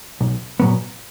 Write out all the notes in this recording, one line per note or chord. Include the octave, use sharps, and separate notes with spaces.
B1
A#2 F#3 B3